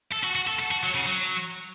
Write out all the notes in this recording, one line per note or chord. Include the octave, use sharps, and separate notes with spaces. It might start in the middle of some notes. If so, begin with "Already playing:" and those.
A4
F#4
F#4
A4
A4
F#4
F#3
C#3
F#3